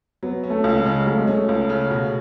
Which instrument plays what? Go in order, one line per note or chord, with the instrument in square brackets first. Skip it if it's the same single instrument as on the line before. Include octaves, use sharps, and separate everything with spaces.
[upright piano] F#3 [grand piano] B3
[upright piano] C#4
[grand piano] A3
[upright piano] C#2
[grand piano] G#3
[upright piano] C#3
[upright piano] F#3 [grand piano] A3
[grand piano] G#3
[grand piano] A3 [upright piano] C#4
[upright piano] C#2
C#3
B2